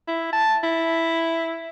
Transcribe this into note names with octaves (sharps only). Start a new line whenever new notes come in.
E4
A5
E4